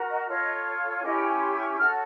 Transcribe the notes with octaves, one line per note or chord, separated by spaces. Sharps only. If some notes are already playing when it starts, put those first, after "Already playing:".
Already playing: F#4 A#4
D#5
F4 A4 C#5 D#5
C#4 E4 G4 D#5
G5
G#5
C6
C#6
F#4 A4 C#5 F6